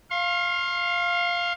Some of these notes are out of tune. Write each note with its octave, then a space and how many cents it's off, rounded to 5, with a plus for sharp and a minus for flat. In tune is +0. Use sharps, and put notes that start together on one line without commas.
F5 +0 C6 +40